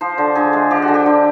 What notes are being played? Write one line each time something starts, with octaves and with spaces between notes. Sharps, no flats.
F3 C5
D3
D3 G#4
G#3
F3 G4
F#4
D3
G4
D3